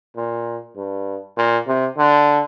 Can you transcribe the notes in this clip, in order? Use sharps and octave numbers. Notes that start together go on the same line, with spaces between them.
A#2
G2
A#2
C3
D3